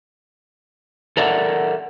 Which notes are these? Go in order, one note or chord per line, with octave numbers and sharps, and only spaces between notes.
A4 A#4 D5 E5 F#5